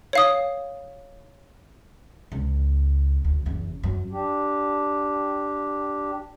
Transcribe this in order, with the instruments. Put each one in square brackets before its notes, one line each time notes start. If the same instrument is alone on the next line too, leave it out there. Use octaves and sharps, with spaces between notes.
[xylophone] C#5 F5 D#6
[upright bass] C#2
D2
F#1 E2
F#2 F#3
[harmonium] D4 G4